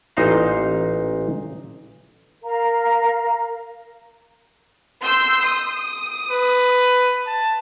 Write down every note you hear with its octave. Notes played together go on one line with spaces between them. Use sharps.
A1 A#2 D#4 C5 F5 A#5
A#4 F5 A#5
C6 E6 G6
D#6
B4
A5